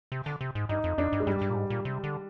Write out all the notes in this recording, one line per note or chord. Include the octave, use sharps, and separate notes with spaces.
C3
D3
C3
G#2
G2 D#4
F2
F2 D4
G2
G#3
G2 G3
G2
A#2
G#2
A#2
C3
D3